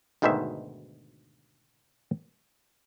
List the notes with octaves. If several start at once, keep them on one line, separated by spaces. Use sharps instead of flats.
D2 G#2 B2 D#3 C5 E5